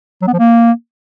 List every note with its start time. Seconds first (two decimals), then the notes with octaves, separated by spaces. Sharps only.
0.22 F#3
0.27 B3
0.33 F3
0.39 A#3